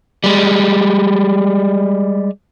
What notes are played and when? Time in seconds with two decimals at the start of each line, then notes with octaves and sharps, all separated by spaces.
0.24 G3 G#3